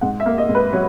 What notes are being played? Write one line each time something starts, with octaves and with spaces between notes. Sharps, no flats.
G#2 F#5
E5
A#3
D#5
G#2
B4
F#3 C#5